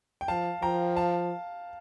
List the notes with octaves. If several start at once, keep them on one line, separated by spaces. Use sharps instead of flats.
G5
F3 F5 A5
F3 G5 A#5
F5 A5